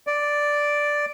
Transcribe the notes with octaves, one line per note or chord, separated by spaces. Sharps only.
D5